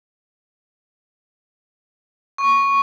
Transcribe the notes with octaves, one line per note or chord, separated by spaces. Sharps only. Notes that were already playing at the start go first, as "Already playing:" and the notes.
C#6